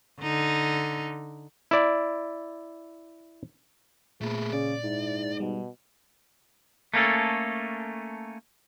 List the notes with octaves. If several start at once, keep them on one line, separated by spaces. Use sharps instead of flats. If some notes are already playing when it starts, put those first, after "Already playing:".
D3 D#4
E4 D5
A#2 A3 B3 G#4
C#3 D5
G#2 E4
B2 G3
A3 A#3 C#4 A4